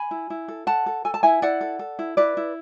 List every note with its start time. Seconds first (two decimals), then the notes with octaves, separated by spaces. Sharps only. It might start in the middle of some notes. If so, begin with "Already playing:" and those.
Already playing: G#5 B5
0.11 E4
0.30 E4
0.48 A4
0.67 A4 F#5 A5
0.86 A4
1.05 A4 G#5
1.14 A5
1.23 E4 E5 G#5
1.42 E4 D5 F#5
1.61 A4
1.79 A4
1.99 E4
2.17 E4 B4 D5
2.37 E4